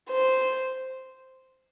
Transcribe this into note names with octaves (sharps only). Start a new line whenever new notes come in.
C5